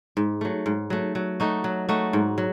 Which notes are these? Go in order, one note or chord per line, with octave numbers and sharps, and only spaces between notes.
G#2
F#3 A3
G#2
F#3 A3
F#3
A3 D#4 F#4
F#3
A3 D#4 F#4
G#2
F#3